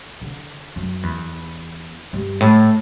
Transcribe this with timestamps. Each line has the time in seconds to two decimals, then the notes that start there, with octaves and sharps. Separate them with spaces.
0.22 D3
0.76 F#2
1.03 E2
2.13 G2
2.40 A2